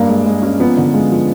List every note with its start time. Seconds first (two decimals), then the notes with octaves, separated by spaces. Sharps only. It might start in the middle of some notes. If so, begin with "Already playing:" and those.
Already playing: G2 A#3
0.09 G#3
0.26 G#3
0.43 C#4
0.60 F3 B3
0.78 D3
0.94 G#3
1.11 F3